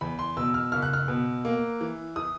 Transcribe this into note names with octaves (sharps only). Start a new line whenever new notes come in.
E2 B5
C6
B2 E6
F6
F#1 F6
F#6
F6
B2
A#3
E3
E3 D#6